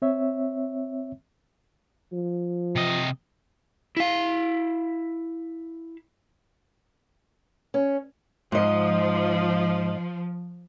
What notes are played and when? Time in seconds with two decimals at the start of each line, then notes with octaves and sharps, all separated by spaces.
0.02 C4 C#5 E5
2.13 F3
2.76 C3 D#5
3.97 E4 F5
7.74 C#4
8.52 G#2 F3 D#5